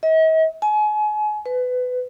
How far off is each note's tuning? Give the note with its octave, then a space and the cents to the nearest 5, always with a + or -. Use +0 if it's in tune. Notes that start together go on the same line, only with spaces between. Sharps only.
D#5 +45
G#5 +35
B4 +20